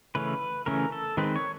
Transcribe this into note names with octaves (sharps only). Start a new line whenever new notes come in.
C#3 E3 A3 C#4 B4
C#3 E3 A3 C#4 A#4
A4
D#3 G#3 C4 B4
C#5